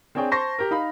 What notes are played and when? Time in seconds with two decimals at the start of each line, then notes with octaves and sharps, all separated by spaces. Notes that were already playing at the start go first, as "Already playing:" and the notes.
0.15 C4 D4 G#4 C#5 G5
0.31 C5 A5 C6 C#6 A#6
0.59 G4 A#4
0.71 D#4 F5 B5